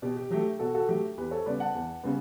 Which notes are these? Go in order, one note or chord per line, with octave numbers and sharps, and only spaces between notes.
B2 G4
G4
F#3 A3 G4
B2 F#4 A4
F#4 A4
F#3 A3 G4
E2 G4 B4
A4 C#5
C#3 G3 B3 B4 D5
F#5 A5
E2
C#3 G3 B3